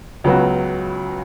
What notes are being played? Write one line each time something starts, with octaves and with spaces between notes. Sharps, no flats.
C#2 C#3 F#3 B3 F#4